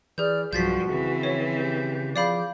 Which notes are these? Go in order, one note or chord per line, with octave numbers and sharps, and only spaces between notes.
E3 G#4 D5 F6 G6
B1 G2 F3 F#4 G6 A6 B6
C#3 E3 C4
C#5
G4 G6
F3 G#4 D5 F5 B5 D6 G6